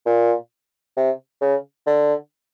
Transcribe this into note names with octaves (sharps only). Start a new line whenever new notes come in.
A#2
C3
C#3
D3